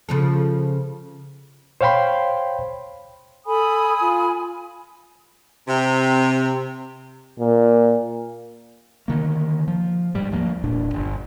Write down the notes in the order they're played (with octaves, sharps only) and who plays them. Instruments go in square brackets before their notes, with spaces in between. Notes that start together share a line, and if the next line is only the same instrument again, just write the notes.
[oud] C#3 F3 A4
[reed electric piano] C5 C#5 F5 G5 B5 C6
[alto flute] A4 [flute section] G#5 B5 D#6
[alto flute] F4
[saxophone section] C3
[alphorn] A#2
[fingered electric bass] D3 D#3 A#3
F3
G#2 G3
D2 F3 G#3 A#3
E1 A#2 D4
G1